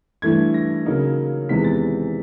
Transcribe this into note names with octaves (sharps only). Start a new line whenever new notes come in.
G2 E3 A3 G#6
A#6
C#3 F#3 A#3 D#4
E2 C3 D#3 G#3 B3 B6
A6